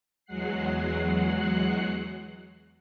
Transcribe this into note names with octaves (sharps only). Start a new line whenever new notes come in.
E2 F#3 G#3 F#5 F#6 C7